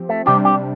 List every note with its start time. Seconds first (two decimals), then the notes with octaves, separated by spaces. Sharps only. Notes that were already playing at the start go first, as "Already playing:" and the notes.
Already playing: F3 C4 G4
0.09 A3
0.26 C3 G3 D4 G4
0.45 G4